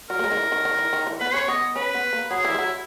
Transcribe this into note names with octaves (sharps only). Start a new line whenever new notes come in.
F#3 A#4
A#3
G#3
D#3
E3
D#3
D#3
E3
D#3
E3
B3 B4
C#4 C#5
B3 D#5
C#4 B4
B3
A#3
F#3 G#4
E3 E4
G#3
F#3 E4